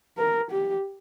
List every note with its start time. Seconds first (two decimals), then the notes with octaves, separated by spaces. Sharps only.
0.18 A#4
0.51 G4